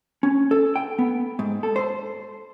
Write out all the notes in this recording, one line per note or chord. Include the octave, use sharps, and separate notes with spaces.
C#4
A4
G5
B3
G#2
A4
C5